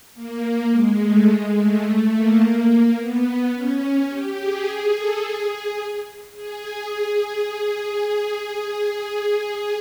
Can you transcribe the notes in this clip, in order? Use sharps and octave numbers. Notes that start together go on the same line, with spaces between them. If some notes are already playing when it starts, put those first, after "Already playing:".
A#3
G#3
A3
G#3
A3
A3
A#3
B3
C#4
G4
G#4
A4
G#4
G#4
G#4